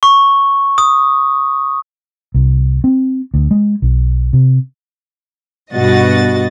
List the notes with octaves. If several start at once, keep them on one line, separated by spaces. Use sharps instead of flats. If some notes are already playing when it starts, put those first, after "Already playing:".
C#6
D#6
C2
C4
D2
G#3
B1
C3
G2 B2 F#4 D#5 F#5 A6